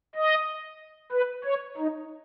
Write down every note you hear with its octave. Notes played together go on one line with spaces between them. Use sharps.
D#5
B4
C#5
D#4